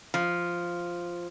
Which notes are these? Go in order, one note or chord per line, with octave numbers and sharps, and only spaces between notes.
F3